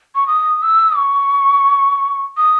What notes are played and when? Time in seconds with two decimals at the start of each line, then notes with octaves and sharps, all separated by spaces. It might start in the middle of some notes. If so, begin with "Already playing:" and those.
0.15 C#6
0.27 D#6
0.62 E6
0.97 C#6
2.37 D#6